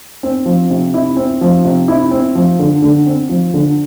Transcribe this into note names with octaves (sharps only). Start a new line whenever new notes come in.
C4
F3
C3
E4
C4
F3
C3
E4
C4
F3
D3
D3
C4
F3
D3